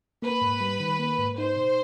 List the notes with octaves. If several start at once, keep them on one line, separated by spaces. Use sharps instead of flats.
A#3 B4
G#2
G3
D#3
A#3
G#2
D#4 C5
B2